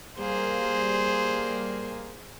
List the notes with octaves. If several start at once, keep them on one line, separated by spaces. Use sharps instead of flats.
G3 A#3 G#4 C5